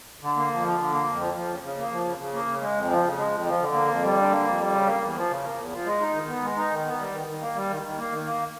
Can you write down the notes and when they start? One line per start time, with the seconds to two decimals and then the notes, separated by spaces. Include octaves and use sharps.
0.21 D3
0.36 A#3
0.49 F2
0.64 F3
0.78 D3
0.91 A#3
1.06 F2
1.20 F3
1.34 F3
1.49 C#3
1.63 C#3
1.77 A#3
1.91 F3
2.06 C#3
2.19 C#3
2.33 A#3
2.47 C#3
2.61 G#3
2.76 F2
2.90 F3
3.04 C#3
3.17 G#3
3.32 F2
3.46 F3
3.60 D3
3.74 A#3
3.88 F2
4.03 G3
4.16 D3
4.30 A#3
4.45 F2
4.58 G3
4.73 C#3
4.86 A#3
5.02 E2
5.15 F3
5.29 C#3
5.44 A#3
5.57 E2
5.71 F3
5.85 G#3
6.00 D#4
6.14 D#3
6.28 B3
6.42 G#3
6.57 D#4
6.71 D#3
6.85 B3
6.99 G3
7.12 D#3
7.27 D#3
7.41 A#3
7.55 G3
7.70 D#3
7.83 D#3
7.97 A#3
8.11 D#3
8.25 A#3